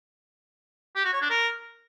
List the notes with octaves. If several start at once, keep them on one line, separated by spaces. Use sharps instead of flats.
G4
F#4
C#5
D4
A#4